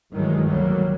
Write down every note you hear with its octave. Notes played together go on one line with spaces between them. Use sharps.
G2 D#3 E3 F#3 G#3
D2 F#3 G3 A#3